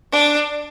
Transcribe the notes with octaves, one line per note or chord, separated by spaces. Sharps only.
D4